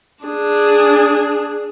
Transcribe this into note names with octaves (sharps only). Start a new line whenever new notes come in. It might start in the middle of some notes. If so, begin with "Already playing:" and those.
D4 G#4